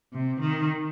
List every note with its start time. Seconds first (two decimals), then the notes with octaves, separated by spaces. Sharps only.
0.13 C3
0.40 D#3